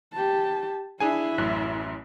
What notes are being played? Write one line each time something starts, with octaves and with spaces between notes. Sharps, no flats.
G4 A5
D4 E4 G#4 E5 G#5
A1 F#2 F#6